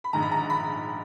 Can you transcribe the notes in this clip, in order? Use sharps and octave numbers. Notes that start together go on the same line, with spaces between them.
B5
A#1 G#2 D#3 A#5
B5
A#5
B5